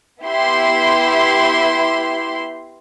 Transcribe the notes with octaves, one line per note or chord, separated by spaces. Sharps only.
B3 E4 G4 E5 C6